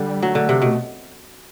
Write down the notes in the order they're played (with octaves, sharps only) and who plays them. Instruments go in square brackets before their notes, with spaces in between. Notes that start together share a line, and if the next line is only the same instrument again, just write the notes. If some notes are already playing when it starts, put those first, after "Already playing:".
Already playing: [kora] D3 [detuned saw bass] G3
[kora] F#3 [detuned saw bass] A3
[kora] D3
C3
[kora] B2 [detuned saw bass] A3